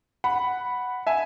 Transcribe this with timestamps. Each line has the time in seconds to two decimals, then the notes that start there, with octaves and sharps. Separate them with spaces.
0.24 F#5 B5
1.07 E5 G#5